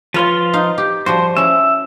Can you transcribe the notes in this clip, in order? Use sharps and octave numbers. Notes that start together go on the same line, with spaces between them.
F3 F4 B4 C#5 F5 C6
D#4 F5
G4
F3 G3 F#4 C5
C#4 E4 E5